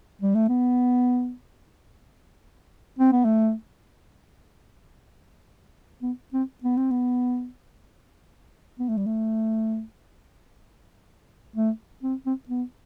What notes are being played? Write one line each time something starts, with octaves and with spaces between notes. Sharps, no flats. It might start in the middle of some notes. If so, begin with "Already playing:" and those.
G3
A3
B3
C4
B3
A3
B3
C4
B3
C4
B3
B3
A3
G3
A3
A3
C4
C4
B3